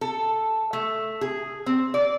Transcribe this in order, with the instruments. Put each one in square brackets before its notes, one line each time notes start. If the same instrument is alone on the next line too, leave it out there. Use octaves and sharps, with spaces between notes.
[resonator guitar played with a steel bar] A4
A3
G#4
C4
D5